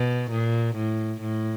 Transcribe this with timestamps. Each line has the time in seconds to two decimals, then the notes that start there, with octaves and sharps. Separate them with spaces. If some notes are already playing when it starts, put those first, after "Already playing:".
Already playing: B2
0.31 A#2
0.76 A2
1.21 A2